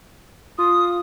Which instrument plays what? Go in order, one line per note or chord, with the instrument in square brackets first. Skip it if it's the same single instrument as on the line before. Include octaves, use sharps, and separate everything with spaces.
[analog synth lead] F4 [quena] D#6